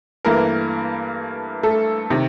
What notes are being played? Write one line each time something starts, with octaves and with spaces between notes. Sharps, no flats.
G2 E3 A3 A#3 A#4
A3 A4
C3 D#3